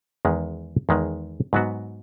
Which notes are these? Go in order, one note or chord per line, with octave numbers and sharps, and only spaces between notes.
E2 D#3 G#3
E2 D#3 G#3
G#2 F#3 B3 F#4